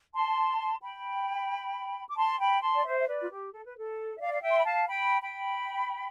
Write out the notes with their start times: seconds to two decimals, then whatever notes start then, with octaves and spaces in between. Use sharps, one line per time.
0.14 A5 C6
0.82 G5 B5
2.09 D6
2.17 A5 C6
2.40 G5 B5
2.62 A5 C6
2.74 D5
2.85 C5 E5
2.99 E5
3.07 B4 D5
3.21 F4
3.30 G4
3.53 A4
3.65 B4
3.77 A4
4.16 E5
4.20 D5 F5
4.33 F5
4.42 E5 G5
4.51 C6
4.58 B5
4.65 F5 A5
4.88 G5 B5
5.22 G5 B5